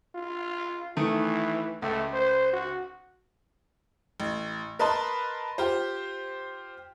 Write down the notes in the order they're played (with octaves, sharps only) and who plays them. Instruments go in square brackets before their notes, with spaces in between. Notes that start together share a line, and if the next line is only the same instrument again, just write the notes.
[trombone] F4
[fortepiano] D#3 A3 [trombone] E3
[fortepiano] C#2 [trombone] A3
[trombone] C5
F#4
[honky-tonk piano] A1
A#4 B4 D#5 A5 B5 C6
F4 G4 C5